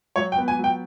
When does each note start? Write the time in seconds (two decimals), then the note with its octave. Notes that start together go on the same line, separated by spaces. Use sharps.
0.16 F#3 C#5
0.32 G5
0.38 B3
0.48 G#5
0.58 F#3
0.64 G5